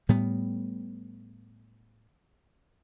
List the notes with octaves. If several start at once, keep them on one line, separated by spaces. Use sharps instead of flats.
A2 G3 B3